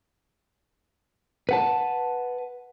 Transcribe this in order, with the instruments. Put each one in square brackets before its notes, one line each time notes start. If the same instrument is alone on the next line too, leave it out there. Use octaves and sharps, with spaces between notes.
[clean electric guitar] B4 F#5 A5